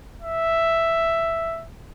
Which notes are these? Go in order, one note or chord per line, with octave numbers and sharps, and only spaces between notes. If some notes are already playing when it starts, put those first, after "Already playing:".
E5